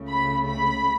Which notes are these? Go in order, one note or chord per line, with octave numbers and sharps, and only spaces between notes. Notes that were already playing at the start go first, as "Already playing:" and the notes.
Already playing: C#2 C#3 A3
B5
B5